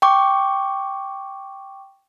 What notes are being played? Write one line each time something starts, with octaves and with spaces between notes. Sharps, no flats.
G5 C#6 D6